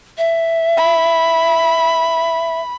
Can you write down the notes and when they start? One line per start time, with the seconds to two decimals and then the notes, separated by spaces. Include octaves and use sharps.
0.18 E5
0.77 B5